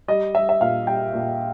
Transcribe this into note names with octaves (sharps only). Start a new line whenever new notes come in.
G3 D#5
G3 E5
E5
A#2 F5
G3 G5
A#2